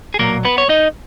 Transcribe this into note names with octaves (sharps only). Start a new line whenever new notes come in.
G#4
B1 A#2 F#3 A#3 A#4
B3 B4
C#5
D#4 D#5